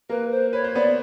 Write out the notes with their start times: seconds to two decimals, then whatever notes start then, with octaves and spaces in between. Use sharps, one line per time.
0.09 A#3 A#4 B4
0.31 C5
0.53 B4 C#5
0.64 C5
0.74 B3 B4 D5